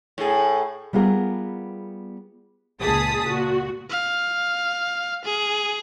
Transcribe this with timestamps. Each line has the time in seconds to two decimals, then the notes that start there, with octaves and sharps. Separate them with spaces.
0.18 A2 G#4
0.93 G3 B3 F4 G#4 A#4
2.81 C#2 A#2 G#4 A5 D#6 B6
3.27 A#2 F#4
3.90 F5
5.25 G#4